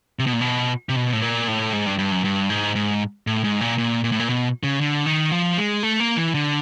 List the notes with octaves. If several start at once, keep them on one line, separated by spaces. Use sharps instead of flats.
C3
B2
A#2
B2
C3
B2
A2
A#2
A2
G#2
G2
G2
F#2
G2
G#2
G#2
A2
G#2
A#2
A#2
A#2
A2
A#2
B2
C#3
D3
D#3
F3
G#3
A3
A#3
E3
D3